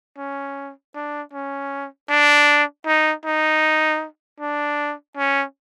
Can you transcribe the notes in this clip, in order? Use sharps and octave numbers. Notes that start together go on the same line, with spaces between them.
C#4
D4
C#4
D4
D#4
D#4
D4
C#4